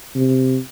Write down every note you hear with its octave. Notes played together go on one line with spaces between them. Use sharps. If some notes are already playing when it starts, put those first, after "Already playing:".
C3